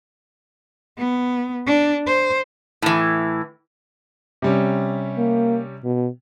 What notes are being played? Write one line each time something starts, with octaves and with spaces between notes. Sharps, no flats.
B3
D4
C5
A2 E3
C3 G3 C#4
A#3
B2